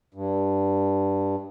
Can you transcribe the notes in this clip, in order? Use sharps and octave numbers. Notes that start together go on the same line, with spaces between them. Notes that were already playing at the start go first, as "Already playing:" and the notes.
G2